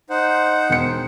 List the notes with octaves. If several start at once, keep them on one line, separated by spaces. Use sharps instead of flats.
D#4 C5 F#5
E1 C#7